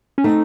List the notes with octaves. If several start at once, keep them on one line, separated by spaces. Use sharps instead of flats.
C#4
A3 C4 D#4